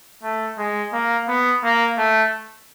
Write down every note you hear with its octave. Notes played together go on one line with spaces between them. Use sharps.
A3
G#3
A#3
B3
A#3
A3